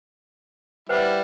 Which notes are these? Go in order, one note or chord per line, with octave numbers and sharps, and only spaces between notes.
G3 E4 B4 C5 F#5